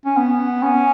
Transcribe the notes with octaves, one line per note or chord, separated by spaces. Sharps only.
C#4
B3
C#4